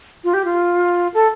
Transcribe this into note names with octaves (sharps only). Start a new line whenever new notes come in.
F4
G4
F4
A4